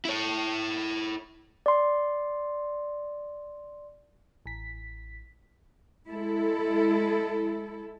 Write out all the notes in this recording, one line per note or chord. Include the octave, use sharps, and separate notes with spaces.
E4 C#5
D5 C6
A1 B6
G#3 E4 A4